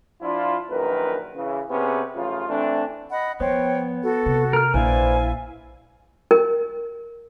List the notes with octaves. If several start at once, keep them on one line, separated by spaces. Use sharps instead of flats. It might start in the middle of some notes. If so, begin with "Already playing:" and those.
F3 D4 E4 F4
A#1 F#2 D#3 A#4 B4
C#3 E3
C3 B3 C#4 G4 G#4 B4
A1 C#3 F3 F4
E3 A3 C4 D4
D#5 F#5 B5
F3 B3 C5 C#5 G5
F#4 A4
C3
A#4 F6
A#1 E4 B4 C5 D5 F5 G#5
A#4